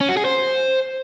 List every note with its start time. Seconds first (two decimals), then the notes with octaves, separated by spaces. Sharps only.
0.01 C#4
0.09 F#4
0.17 G#4
0.25 C5